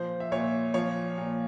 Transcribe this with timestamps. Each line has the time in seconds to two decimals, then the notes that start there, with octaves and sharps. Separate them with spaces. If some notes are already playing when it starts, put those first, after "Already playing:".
Already playing: A#2 F3 C5
0.20 E5
0.32 A#2 C#5
0.74 F3 C#5
1.18 A#2